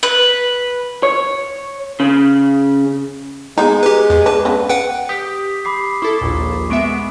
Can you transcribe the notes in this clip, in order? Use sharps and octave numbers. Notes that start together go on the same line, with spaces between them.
B4
C#5
C#3
G#3 B3 D#4 A#5
G4 B4
E2
D4 B4
C#3 B3 D4
B4 F#5 G5
G4 D#6 B6
B5 D6 C7
E4 A4 C#6
A#1 D#2 A#2
G#3 B3 E5 C#6 D7